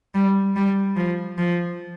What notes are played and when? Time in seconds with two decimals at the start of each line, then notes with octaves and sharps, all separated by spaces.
0.14 G3
0.56 G3
0.96 F3
1.38 F3